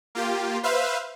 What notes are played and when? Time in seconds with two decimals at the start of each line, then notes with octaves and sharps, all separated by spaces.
0.15 A#3 F4 G4
0.63 B4 C5 E5 F5